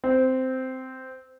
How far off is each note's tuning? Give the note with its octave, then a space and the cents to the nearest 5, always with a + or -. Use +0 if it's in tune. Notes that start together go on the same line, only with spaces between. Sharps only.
C4 -10